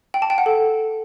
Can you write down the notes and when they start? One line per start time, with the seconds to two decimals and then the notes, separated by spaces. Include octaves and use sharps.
0.14 G5
0.22 A5
0.30 G5
0.38 F#5
0.46 A4